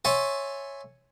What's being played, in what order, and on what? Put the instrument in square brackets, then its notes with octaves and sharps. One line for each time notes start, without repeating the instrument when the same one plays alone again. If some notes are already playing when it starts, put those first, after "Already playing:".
[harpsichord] C#5 E5 G#5 A5 C6